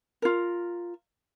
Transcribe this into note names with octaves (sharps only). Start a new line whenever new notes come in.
F4 A#4